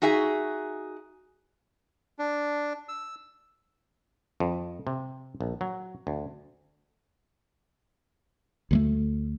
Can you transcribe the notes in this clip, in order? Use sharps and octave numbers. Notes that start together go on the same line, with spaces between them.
D#4 F#4 G#4 E5
D4
E6
F2
C3
A#1
F#3
D2
D2 G3 A3